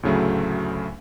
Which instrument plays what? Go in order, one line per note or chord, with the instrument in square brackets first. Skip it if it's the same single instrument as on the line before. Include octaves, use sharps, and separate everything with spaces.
[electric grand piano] D2 A2 C#3 F#3 A3